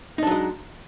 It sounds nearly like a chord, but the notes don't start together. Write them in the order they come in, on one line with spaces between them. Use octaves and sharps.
D#4 D4 F#3 G#3